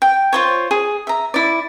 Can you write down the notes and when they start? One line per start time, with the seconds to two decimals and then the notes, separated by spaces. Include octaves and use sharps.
0.02 G5
0.33 F4 C5 C#5
0.71 G#4
1.07 E5 A#5
1.34 E4 D5